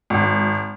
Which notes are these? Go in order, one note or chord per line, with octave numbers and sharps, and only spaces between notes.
G#1